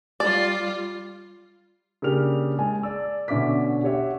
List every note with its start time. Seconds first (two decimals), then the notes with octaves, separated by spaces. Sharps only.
0.20 G3 F4 D5
2.02 C#3 A#3 D4 G4 F6 F7
2.58 G#3 G#5 A5
2.83 D5 E6
3.28 B2 D3 C#4 E5 D6 B6
3.83 G4 C#5 E5 F#5